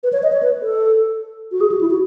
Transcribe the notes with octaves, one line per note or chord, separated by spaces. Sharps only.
B4
C#5
D#5
C#5
B4
A4
F#4
G#4
F#4
E4
F#4